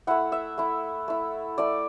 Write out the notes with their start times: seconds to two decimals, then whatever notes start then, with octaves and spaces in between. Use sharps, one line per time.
0.07 A3 E4 F#5
0.32 E5
0.58 A3 E4
1.08 A3 E4
1.58 A3 E4 D5